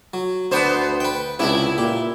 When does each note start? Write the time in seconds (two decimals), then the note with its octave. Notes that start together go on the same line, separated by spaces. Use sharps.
0.14 F#3
0.51 D2 B3 D4 B4 C5
1.00 B4 G5
1.39 C#2 C3 B3 D4 E4
1.78 A#2 G4